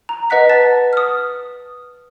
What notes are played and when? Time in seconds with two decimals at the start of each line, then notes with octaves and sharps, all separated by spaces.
0.09 A#5
0.30 B4 D#5 F#5 F#6 B6
0.49 A5 A6 B6
0.93 D#6 F6